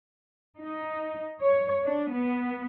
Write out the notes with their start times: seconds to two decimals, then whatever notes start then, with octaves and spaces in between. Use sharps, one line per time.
0.62 D#4
1.42 C#5
1.85 D4
2.14 B3